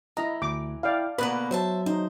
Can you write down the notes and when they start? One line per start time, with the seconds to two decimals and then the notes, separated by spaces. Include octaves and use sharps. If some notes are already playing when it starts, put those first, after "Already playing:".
0.17 E3 E4 D#5 A#5
0.42 D2 D6
0.83 E4 D5 F5 G5
1.18 B2 D3 A#3 B4 B5 F#6
1.51 F#3 C5 E5 A5
1.86 D#4 C5